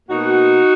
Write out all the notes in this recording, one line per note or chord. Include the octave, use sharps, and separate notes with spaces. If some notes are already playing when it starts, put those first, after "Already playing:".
B2 A#3 D#4 F#4